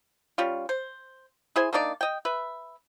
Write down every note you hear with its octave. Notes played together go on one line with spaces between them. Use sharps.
G3 C#4 F4
C5
E4 G#4 C5 G#5
A#3 D4 D#4 D5
D#5 G5
B4 E5